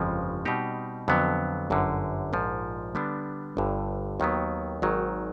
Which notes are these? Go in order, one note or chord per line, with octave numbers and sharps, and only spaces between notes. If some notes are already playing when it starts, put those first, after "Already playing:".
Already playing: G1 F2 C#3 F3 G#3
B2 G3 C4 D#4 G4
F2 D3 F#3 B3
G1 F#2 D3
A#1 G#2 F3
D3 G3 B3 D4
G1 G2 D3
D#2 D#3 F#3 B3
G#1 G#2 D#3 F#3